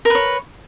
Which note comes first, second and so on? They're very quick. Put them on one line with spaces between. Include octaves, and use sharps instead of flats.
A#4 B4 C#5